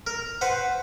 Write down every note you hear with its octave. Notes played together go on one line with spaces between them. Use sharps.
A#4
B4 C5 F#5